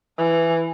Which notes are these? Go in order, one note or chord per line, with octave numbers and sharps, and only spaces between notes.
E3